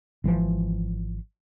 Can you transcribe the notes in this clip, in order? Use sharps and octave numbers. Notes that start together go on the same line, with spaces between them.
G#1 E3 F3